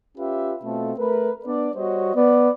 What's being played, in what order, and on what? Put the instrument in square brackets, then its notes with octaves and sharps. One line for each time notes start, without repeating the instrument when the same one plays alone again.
[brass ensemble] C#4 F4 G4 B4 E5
B2 A3 C4 F4 A4
A3 A#4 B4
B3 D4 D5
G3 F#4 C5 C#5 D#5
B3 D5